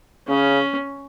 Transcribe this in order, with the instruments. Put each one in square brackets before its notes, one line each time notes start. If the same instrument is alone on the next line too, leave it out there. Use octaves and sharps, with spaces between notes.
[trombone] C#3 [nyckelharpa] C#4